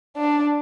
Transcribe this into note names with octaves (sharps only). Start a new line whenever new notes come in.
D4